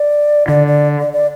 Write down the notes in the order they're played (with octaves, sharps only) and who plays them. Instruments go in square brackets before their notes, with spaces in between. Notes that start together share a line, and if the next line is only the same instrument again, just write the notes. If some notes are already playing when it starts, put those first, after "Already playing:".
Already playing: [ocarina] D5
[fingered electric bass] D3 [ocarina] D5
[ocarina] D5
D5
D5